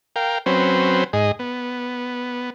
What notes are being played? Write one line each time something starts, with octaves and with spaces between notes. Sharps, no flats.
A#4 F5 G5
F#3 C4 C#4 B4 C5
G#2 G#4 D#5
B3